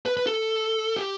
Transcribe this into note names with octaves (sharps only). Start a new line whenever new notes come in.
B4
B4
A4
G4